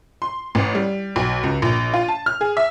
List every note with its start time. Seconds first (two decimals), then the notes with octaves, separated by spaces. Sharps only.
0.22 C6
0.55 A1
0.75 G3
1.16 B1
1.43 C#2
1.62 A#1
1.94 F4
2.08 A5
2.26 F6
2.41 G#4
2.57 E5